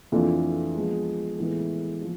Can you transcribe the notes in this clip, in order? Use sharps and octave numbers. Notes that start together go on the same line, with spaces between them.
F2 E3 A3 D4 F4
F3 G#3 B3
A2 E3 G#3 B3 E4
F3